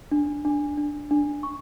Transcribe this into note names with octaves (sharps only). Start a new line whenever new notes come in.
D4
D4
D4
D4
C#6